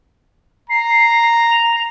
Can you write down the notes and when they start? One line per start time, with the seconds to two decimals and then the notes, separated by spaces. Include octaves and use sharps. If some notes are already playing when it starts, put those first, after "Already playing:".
0.70 A#5 C7
1.51 F7